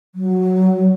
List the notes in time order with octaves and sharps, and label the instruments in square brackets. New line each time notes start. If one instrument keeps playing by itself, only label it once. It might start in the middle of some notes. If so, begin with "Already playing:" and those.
[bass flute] F#3